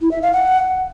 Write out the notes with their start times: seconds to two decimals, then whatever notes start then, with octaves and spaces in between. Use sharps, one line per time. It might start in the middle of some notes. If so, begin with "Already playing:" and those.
0.01 E4
0.11 E5
0.22 F5
0.33 F#5